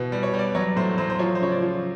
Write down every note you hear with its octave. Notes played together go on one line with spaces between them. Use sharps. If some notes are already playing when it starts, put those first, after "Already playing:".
Already playing: B2 E3
G3
C#5
G3
D5
F#3 C#5
A2 C5
F#3 C5
C5
F3 C#5
C5
C#3 C#5
D5
F3